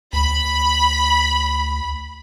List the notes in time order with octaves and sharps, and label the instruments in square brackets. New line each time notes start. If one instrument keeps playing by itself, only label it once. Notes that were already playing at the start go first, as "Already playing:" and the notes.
[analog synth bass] D2 [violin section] B5